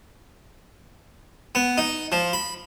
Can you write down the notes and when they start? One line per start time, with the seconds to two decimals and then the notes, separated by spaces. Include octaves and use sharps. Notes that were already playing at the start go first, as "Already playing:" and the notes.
1.55 B3
1.78 D#4
2.12 F3
2.33 B5